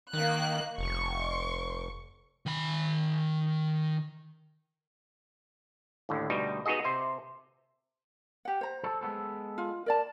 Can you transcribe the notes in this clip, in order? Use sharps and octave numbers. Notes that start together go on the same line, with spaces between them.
D#3 A#3 F#6
F1 C#6
D#3 B5
D#2 A2 D3
D2 B2 G3 D#4
B3 D#4 F#4 G#4 D#5
C3 C5 E5
G4 F#5
C5 A#5
A4
G#3 B3 A4
F4
A#4 D5 A5